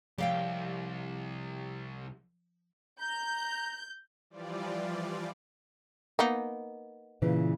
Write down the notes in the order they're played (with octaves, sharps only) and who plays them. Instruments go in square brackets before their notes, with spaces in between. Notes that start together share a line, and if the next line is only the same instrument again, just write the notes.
[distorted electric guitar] C2 [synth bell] F3 [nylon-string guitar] G4 F5 G5
[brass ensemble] A#5 [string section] G6
[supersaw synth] E3 F3 G3 F4 D5
[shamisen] A#3 B3 D#4
[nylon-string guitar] A#2 C#3 E3